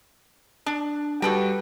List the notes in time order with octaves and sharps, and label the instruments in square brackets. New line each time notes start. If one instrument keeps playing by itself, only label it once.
[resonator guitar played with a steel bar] D4
[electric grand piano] G3 F#4 [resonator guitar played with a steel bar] A4 B4 G5